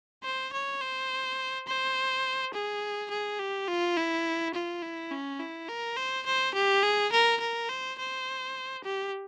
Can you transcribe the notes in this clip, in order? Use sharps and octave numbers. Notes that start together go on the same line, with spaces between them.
C5
C#5
C5
C5
G#4
G#4
G4
F4
E4
F4
E4
C#4
E4
A#4
C5
C5
G4
G#4
A#4
A#4
C5
C5
G4